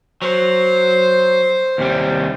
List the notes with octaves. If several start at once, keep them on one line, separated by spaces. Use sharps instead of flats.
F#3 C5
D#2 C3 G3